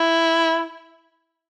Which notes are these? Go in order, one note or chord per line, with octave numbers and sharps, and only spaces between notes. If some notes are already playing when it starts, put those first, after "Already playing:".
Already playing: E4